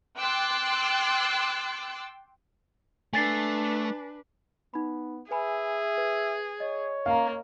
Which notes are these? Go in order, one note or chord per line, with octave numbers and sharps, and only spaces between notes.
G5 C6 D6 E6 F#6 A6
A3 D4 B4 G#5 A6 C7
B3 D#4 B5
G#4 B4 E5 G#5 B5
B4
C#5 D#5
A#3 F5 A#5